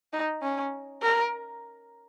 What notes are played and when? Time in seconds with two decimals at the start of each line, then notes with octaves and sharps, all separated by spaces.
0.13 D#4
0.43 C#4
1.02 A#4